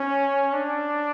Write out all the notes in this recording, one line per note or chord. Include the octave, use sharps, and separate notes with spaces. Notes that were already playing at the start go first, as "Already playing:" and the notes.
Already playing: C#4
D4